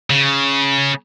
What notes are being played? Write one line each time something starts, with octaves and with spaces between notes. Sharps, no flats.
C#3